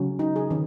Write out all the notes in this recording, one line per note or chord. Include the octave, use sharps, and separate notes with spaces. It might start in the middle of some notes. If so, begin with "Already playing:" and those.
Already playing: C#3 F#3 C#4
D#4
G#4
D#3 C#4